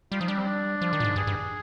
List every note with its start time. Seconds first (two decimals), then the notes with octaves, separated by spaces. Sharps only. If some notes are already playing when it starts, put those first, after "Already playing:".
0.12 G3 F4
0.20 F3 D#4
0.28 G3 D4
0.38 C4
0.46 D4
0.82 F3
0.93 D#3
1.00 A#2
1.04 G#2
1.16 G2 G#4
1.27 G2